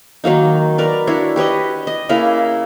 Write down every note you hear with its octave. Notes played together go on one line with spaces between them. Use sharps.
D#3 F#3 A#3 D#4
A#4 B4 D5
D4 E4 F#4 C#5
G4 B4 C#5 D#5
D#5
C#3 A#3 E4 A#4